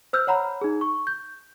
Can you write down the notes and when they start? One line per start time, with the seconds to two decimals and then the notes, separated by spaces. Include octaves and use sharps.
0.13 C5 E6 F6 G6
0.27 C#5 F#5 A#5 B5
0.61 D#4 G#4
0.81 C#6
1.07 G6